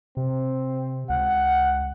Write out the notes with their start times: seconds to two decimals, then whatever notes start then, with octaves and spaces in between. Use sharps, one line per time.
0.17 C3 C4
1.10 C#2 F#5